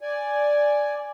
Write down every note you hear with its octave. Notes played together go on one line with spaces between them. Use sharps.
D5 G#5